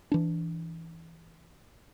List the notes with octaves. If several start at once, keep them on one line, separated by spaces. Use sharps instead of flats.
E3 D4